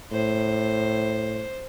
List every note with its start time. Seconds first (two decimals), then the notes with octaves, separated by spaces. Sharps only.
0.12 A2 C5